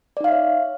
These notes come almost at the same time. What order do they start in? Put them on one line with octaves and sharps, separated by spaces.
D5 D#4 F5 E5 C#5